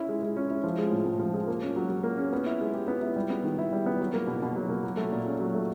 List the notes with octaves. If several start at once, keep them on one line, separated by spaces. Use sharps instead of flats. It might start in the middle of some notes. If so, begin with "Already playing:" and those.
Already playing: C#4 E4
G#3
G#3
C#4
E4
F3
G#3
A2
A2
F3
G#3
A#3
C#4
F#3
F#3
A#3
C#4
B3
E4
G#3
G4
B3
E4
G3
B3
D#3
E4
G3
B3
F#3
A#3
B2
B2
F#3
A#3
F#3
A3
A#2
C#4
F#3
A3